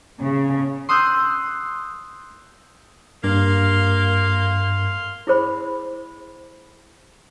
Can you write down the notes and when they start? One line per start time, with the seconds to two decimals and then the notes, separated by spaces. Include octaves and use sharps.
0.21 C#3
0.89 C6 D#6 E6 F#6 G6
3.24 G2 A#3 F5 C6
5.27 E4 G#4 C5 B5